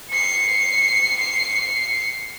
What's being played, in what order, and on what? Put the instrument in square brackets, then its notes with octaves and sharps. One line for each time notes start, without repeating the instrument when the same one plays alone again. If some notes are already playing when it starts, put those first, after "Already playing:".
[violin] C7 C#7